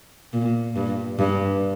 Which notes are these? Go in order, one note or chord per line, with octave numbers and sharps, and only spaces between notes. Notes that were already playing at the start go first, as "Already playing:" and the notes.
A#2
G2
G2